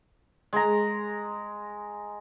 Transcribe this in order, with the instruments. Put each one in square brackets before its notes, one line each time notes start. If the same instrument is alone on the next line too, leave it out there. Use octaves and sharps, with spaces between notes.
[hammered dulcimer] G#3 A#5